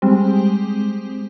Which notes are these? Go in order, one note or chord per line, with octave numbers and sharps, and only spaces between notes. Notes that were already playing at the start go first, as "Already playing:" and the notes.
G3 G#3 C4